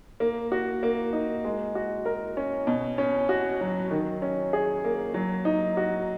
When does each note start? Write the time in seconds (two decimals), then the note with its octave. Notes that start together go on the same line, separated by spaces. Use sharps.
0.20 A#3
0.52 F#4
0.83 A#3
1.13 D#4
1.45 G#3
1.75 F#4
2.06 A#4
2.37 C#4
2.67 B2
2.98 C#4
3.29 F#4
3.61 F#3
3.91 D#3
4.22 C#4
4.53 G#4
4.84 A#3
5.14 F#3
5.45 D#4
5.77 F#4